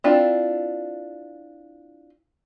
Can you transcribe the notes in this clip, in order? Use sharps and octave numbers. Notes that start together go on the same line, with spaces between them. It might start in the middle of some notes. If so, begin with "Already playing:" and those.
C4 D4 E4 F4